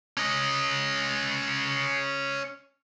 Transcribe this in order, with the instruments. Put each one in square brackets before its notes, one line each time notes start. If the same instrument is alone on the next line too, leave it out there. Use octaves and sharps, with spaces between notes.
[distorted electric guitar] C#4 D#5